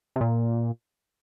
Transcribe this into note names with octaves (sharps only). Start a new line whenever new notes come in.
C3
A#2